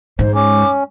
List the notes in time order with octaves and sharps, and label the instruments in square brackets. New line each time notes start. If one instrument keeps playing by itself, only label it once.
[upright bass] G#2 [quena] C5
[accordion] C#4 [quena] D6